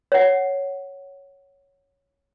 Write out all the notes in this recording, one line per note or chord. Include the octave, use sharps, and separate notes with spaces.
C#5 F#5